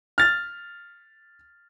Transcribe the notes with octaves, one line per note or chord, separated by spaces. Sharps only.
F6 A6